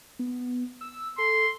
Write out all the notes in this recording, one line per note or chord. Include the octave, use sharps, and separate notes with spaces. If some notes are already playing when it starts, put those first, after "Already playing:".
B3
E6
A4 C6